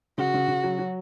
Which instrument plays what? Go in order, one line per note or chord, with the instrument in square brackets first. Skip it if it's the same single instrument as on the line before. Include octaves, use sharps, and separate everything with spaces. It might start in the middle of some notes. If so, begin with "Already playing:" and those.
[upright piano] C#3 [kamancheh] F#4
[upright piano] C#3
C#3
F#3
F#3